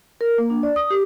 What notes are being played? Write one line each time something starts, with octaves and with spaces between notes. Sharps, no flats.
A#4
A#3
D4
D5
D#6
G4